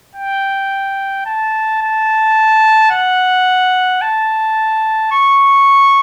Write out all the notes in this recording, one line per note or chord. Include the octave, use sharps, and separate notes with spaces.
G5
A5
A5
F#5
A5
C#6